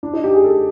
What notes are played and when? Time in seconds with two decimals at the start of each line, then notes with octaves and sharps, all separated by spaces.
0.03 D4
0.13 D#4
0.24 G4
0.34 G#4
0.44 A4